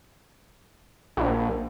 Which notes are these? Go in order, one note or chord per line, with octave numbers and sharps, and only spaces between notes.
A#1